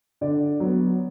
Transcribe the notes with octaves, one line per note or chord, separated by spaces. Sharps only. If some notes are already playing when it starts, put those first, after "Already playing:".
D3 D5
F#3 B3